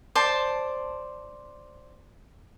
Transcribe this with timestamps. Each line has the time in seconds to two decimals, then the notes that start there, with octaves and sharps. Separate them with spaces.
0.15 C5 D5 A5